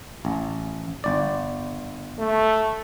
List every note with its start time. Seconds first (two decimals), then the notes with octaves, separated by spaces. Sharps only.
0.25 A1
1.04 G1 D5
2.19 A3